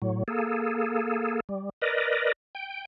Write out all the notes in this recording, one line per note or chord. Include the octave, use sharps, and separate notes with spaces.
A2 F#3
A#3 G#4 A4
G3
A#4 B4 D5 D#5
G5